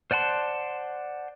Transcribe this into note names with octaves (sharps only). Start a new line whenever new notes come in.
C5 D5 F#5 A5 C6